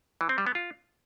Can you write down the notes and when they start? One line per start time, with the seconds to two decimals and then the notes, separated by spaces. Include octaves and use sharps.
0.21 E3
0.29 C4
0.38 G3
0.47 B3
0.55 F4